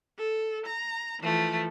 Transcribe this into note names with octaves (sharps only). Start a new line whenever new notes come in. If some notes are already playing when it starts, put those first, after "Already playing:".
A4
A#5
E3 F3 A3